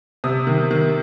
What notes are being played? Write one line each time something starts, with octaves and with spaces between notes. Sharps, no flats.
C3 D#6
D#3
D#3